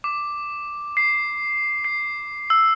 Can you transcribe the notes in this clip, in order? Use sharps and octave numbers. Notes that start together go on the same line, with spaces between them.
D6
C7
C7
E6